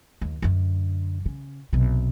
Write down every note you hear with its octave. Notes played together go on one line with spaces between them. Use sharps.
D#2
F#2 D3
C#3
B1 C3